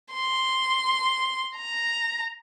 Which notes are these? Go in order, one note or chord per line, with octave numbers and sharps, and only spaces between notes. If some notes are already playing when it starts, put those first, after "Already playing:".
C6
A#5